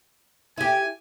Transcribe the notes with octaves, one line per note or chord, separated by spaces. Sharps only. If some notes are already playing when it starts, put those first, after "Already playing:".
E4 G4 G#5